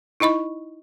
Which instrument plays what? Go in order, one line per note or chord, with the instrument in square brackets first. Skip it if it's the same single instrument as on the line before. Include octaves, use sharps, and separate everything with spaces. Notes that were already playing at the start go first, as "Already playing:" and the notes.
[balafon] D#4 E4 D#5 B5 C#6